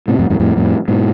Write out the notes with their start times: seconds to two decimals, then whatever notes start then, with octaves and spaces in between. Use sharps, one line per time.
0.08 A2 C3
0.19 F2 A2
0.30 E2 G#2
0.40 F2 A2
0.56 F2 A2
0.88 G#2 B2